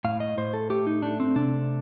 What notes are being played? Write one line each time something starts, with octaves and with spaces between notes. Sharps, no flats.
A2 F5
D#5
A2 C5
A4
A3 G4
D#4
A3 D4
C4
C3 D4